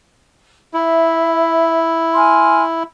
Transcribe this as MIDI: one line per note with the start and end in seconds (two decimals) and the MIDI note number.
0.74 2.83 64
0.74 1.79 76
2.15 2.63 80
2.15 2.63 84
2.15 2.63 89